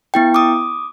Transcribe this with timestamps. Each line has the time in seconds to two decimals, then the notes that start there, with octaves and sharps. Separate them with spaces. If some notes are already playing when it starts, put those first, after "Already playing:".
0.14 B3 E4 G5
0.34 D6 D#6